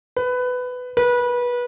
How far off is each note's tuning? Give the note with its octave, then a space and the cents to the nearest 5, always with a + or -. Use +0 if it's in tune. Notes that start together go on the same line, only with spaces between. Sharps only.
B4 +15
B4 -25